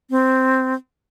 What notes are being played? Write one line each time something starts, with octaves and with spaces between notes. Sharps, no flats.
C4